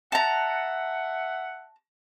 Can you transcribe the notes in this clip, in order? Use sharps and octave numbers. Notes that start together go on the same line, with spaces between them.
E5 F#5 A5 A#5